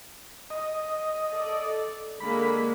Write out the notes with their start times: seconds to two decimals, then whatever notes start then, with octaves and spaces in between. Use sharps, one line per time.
0.50 D#5
1.32 A4 D5
2.20 D3 G#3 A#3 B5